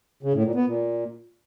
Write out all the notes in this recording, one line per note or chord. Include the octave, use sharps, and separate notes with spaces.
C#3
A2
A#2
B3
A#2